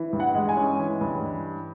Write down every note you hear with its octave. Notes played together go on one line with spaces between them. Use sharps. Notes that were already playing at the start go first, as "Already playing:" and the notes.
Already playing: E3
G2
F#5
G#3
G#5
C#4
E3
G2